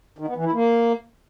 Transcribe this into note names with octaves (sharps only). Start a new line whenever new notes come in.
D#3
B3
E3
E4
A#3